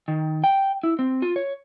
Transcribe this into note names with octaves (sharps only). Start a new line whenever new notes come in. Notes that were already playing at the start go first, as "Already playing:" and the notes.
D#3
G5
E4
C4
F4
C#5